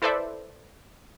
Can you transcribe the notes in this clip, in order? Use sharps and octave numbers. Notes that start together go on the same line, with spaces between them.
E4 A4 B4 C5 D5 E5